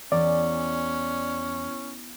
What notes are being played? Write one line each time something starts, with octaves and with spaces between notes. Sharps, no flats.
E2 C#4 D5